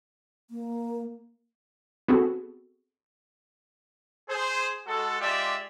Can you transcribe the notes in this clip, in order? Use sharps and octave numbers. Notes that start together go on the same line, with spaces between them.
A#3
B3 C4 F#4 G#4 A4
G#4 C5
G#3 F#4 A4
G#3 F4 G4 D5 E5